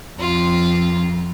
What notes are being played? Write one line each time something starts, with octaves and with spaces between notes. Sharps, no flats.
F2 F4